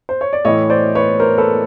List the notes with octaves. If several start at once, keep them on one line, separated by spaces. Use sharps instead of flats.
C5
C#5
D5
A2 E3 C#5 D#5
C5 D5
B4 C#5
A#4 C5
A4 B4